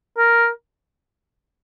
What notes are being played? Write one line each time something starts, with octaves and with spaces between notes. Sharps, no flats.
A#4